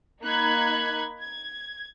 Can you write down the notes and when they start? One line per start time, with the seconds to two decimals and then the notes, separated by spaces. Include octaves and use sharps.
0.23 A#3 D#4 B5 F#6 G#6
1.20 G#6